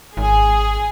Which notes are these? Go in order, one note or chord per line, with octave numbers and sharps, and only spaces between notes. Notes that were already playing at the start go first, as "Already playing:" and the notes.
G#1 G#4